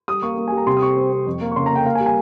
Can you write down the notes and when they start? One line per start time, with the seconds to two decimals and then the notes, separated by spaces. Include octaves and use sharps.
0.08 G3 D#6
0.23 A#3 C#6
0.38 A#3
0.48 G#5
0.52 G3
0.57 A#5
0.67 C3 C6
0.77 D#6
0.82 C4 C#6
0.97 C4
1.12 C4
1.27 F2
1.41 A#3
1.51 C#6
1.56 C#3 C6
1.66 A#5
1.71 A#3 G5
1.85 A#3 F5
1.95 G#5
2.00 G3
2.06 G#5